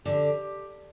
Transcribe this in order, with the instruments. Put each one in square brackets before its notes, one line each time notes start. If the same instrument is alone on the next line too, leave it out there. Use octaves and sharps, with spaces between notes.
[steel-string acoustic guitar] D3 [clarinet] G4